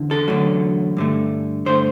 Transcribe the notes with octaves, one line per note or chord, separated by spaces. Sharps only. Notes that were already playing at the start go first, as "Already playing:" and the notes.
Already playing: E2 D3
A4
E2 D3 F#3 A3
G2 D3 A3
G2 D3 A3 C5